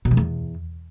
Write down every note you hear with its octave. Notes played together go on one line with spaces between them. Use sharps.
B2
E3
E2